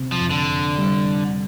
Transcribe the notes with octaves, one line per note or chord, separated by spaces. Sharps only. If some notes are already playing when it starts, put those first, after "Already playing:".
Already playing: C3 C4
F3
F2
D3
F2
G3